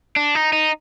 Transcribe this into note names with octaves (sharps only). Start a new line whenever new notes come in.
D4
D#4
D#4